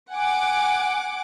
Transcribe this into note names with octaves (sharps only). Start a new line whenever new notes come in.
F#5 G#5 D6